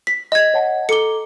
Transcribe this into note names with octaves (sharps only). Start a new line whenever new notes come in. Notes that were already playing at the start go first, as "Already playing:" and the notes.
B6
D#5 G#6
C#5 F#5 A5
A4 A#5 D6 C#7 G7